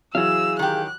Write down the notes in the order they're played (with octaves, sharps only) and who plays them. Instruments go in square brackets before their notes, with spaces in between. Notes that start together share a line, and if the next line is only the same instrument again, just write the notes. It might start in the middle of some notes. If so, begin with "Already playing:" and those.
[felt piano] E3 F#3 [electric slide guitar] G#4 F5 [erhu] E6
[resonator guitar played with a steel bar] D#3 G4 [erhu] F#6